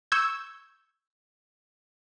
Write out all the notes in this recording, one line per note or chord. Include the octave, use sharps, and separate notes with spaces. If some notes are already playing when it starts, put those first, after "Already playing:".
C#6 E6 G6 G#6